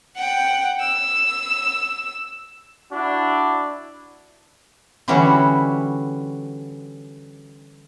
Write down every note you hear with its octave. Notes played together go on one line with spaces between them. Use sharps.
F#5 G5
E6
D4 E4 F#4
D3 E3 G3 C#4 E4 F#4